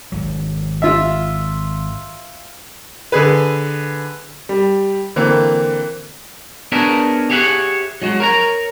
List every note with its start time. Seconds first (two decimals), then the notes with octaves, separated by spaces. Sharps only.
0.12 G#1 F#3
0.82 F4 E5
3.12 D3 G#4 B4
4.49 G3
5.16 D3 E3 A#3 C4
6.72 B3 D4 G#4 A#4 C#5 E5
7.30 G4 G#4 C#5 E5 F#5
8.02 F#3 G#3 F#4
8.20 A#4 C#5 A#5